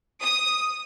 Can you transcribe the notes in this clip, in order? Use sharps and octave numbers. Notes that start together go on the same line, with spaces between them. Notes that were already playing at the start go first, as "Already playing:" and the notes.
D#6